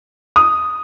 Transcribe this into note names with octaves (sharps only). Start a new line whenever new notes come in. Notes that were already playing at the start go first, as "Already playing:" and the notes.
D#6